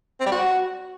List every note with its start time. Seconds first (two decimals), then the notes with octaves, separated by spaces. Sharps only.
0.20 C4
0.26 G3
0.32 F#4